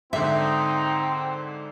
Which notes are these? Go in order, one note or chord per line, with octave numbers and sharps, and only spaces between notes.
G#2 D3 C4 D#4 E5